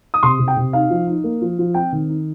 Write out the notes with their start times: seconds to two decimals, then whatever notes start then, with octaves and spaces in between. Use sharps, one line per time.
0.14 D#6
0.23 C3 C6
0.39 C3
0.48 G5
0.57 C3
0.73 D#4 F5
0.90 F3
1.07 D#4
1.24 A#3
1.41 F3
1.59 F3
1.74 C4 G5
1.92 D#3
2.09 D#4